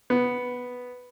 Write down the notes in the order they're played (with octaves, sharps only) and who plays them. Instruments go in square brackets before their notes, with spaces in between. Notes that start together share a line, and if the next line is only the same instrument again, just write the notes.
[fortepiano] B3